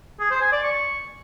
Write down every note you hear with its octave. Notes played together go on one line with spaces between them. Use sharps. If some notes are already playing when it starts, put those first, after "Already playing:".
G#4
C5
G#5
D5
C#6